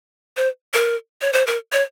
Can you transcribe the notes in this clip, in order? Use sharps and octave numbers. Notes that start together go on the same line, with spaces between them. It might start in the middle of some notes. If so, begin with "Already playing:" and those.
C5
A#4
C#5
C5
A#4
C#5